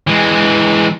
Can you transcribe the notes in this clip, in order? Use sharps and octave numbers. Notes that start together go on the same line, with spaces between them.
E3 G#3